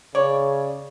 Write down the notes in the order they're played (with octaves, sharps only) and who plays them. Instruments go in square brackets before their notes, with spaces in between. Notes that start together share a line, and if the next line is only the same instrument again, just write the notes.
[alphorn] C#3 [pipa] C#5 [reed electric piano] D5